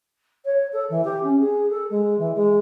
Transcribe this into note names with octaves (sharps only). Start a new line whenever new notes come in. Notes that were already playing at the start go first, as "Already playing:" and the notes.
C#5
A4
E3
G4
C#4
G#4
A4
G#3
E3
G#3